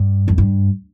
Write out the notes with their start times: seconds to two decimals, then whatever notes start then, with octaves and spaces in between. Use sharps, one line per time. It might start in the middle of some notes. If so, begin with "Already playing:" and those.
Already playing: G2
0.28 F2
0.38 G2